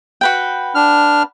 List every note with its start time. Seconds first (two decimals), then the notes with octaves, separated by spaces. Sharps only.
0.21 F#4 B4 G5
0.75 D4 F6